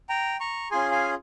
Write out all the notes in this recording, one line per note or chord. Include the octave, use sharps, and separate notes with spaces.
G5 A#5
A#5 C#6
C#4 F4 G#4 G#5 C6
F5 G#5